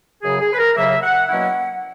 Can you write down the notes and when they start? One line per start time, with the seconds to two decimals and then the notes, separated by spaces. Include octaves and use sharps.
0.23 F#2 C#3 F#3 G#4
0.41 G#4
0.52 B4
0.58 A#4
0.76 D#2 C#3 F#3 A#3 E5
1.03 F#5
1.29 B2 F#3 A#3 C#4 E4 F#5